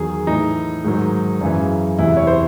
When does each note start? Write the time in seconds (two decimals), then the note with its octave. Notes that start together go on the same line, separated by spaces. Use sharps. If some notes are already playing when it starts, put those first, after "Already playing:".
Already playing: E2 D#3 F#3 G#4
0.27 A2 E3 D#4
0.84 G#2 D#3 F#3
1.41 F#2 C#3 E3
1.99 E2 C3 E3 E4
2.17 C#5
2.27 C5